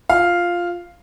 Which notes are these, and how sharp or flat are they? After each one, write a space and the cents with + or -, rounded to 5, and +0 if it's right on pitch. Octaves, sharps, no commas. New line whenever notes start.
F4 +0 F5 +0